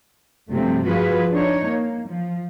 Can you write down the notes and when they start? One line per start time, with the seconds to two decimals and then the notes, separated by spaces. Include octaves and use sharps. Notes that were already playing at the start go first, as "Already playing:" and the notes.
0.49 G2 C3 F3 F#3 A3 C4
0.87 F3 F4 F#4 G#4 B4
1.31 D4 D#4 C#5
1.67 A#3
2.08 F3